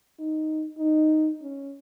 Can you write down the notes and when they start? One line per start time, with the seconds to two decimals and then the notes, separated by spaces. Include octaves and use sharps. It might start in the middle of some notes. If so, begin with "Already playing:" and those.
0.19 D#4
0.78 D#4
1.42 C#4